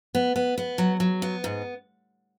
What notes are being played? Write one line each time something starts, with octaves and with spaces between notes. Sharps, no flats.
B3
B3
B3
F#3
F#3
B3
G#2